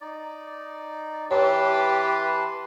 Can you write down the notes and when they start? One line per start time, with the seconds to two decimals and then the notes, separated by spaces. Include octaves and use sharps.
0.01 D#4 D5
1.31 E3 G4 B4 C#5 A5 C6